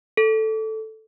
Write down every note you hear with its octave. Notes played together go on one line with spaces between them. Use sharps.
A4